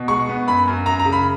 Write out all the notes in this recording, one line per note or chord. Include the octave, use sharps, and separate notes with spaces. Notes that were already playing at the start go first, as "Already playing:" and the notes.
Already playing: B2
G#3 C#6
B3
F#2 B5
F#2
F#2 A#5
A#5
C#3
B5